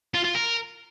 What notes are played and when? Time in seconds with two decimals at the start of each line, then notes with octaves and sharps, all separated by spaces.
0.14 F4
0.24 F4
0.35 A#4